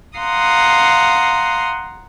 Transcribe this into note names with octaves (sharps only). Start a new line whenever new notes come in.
F5 F#5 A#5 C6 D#6